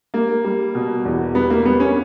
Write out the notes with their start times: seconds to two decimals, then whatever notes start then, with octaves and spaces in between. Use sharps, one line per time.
0.14 G3 A#3
0.44 G3
0.75 B2
1.05 E2
1.35 G3 B3
1.50 A#3
1.65 G3 B3
1.80 C#4